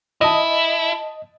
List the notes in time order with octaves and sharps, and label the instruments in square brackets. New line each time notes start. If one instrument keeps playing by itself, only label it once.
[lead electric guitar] E4 [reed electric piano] D#5 [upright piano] A5 D#6